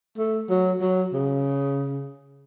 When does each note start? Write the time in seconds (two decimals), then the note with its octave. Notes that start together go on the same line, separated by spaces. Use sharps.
0.18 A3
0.49 F#3
0.81 F#3
1.13 C#3